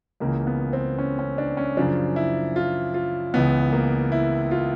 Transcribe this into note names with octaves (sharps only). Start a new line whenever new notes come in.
C#2 C#3 E3 A#3
B3
C4
C#4
C#4
D4
C#4
F#2 C#3 F3 D4
E4
F4
F4
C#2 C#3 E3 B3
A#3
E4
F4